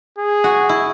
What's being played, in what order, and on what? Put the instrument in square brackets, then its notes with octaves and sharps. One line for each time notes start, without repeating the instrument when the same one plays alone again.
[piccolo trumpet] G#4
[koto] F#4
E4